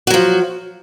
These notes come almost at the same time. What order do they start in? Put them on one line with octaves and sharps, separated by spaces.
F#4 F#3 F3